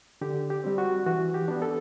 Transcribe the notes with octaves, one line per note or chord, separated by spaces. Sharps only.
D3 G4
G4
G3 C4
F#4
E3 F#4
G4
B3 D4
A4